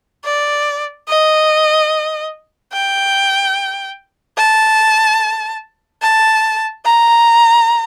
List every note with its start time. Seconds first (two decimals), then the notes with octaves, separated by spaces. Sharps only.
0.25 D5
1.08 D#5
2.72 G5
4.37 A5
6.02 A5
6.85 A#5